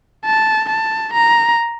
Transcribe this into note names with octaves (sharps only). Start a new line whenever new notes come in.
A5
A5
A#5